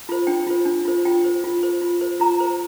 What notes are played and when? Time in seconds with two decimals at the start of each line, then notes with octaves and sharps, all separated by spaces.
0.09 F4 C5
0.27 D4 G5
0.47 F4 C5
0.65 D4
0.85 F4 C5
1.05 F4 G5
1.25 C5
1.44 F4
1.63 C5
1.81 F4
2.01 C5
2.20 F4 A#5
2.40 C5